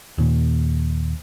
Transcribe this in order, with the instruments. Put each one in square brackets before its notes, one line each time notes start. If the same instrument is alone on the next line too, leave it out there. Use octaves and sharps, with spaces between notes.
[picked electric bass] D#2 A#2